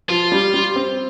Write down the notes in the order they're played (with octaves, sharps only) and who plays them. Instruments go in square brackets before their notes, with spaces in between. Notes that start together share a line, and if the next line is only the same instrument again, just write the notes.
[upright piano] F3 [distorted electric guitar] F4
[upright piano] G3
G3
C4